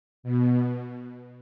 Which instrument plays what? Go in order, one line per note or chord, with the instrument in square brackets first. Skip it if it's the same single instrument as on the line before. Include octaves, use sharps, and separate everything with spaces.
[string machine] B2